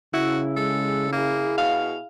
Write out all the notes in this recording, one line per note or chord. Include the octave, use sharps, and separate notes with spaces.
C#3 E4 F#4
G#3 A4
A#3 E4 G#4
B2 F5